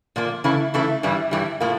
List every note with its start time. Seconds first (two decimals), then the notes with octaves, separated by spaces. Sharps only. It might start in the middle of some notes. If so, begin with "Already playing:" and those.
0.16 A#2 F3 A#3
0.44 C#3 E3 A3 E4
0.74 C#3 E3 A3 E4
1.03 G2 E3 G3
1.31 G2 E3 G3
1.61 A2 F3 A#3